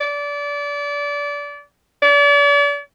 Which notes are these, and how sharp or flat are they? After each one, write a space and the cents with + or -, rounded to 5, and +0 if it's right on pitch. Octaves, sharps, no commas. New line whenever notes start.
D5 -25
D5 -40